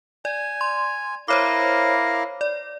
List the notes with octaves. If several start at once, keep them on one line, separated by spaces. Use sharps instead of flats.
D5 G#5
C6
E4 A#4 C5 C#5 F5 D6
D5